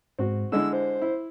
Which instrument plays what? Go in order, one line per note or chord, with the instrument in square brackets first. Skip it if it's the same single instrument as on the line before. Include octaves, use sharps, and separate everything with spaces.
[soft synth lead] G#2 [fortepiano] C4 F#4
[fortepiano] D3 G#3 E4 [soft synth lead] E6
[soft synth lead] C5
[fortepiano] E4